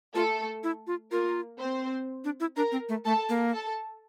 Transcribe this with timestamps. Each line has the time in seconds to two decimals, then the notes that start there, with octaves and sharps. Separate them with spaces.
0.14 A3 F4 A4
0.64 E4
0.87 F4
1.11 A#3 F4 A#4
1.60 C4 C5
2.25 D4
2.40 E4
2.56 D4 A#4 A#5
2.72 C4
2.89 A3
3.05 A3 A4 A5
3.29 A#3
3.53 A4 A5